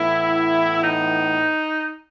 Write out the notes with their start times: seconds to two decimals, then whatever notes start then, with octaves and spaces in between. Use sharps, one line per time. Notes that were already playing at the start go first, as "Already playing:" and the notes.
Already playing: A2 E3 B3 E4
0.82 D#4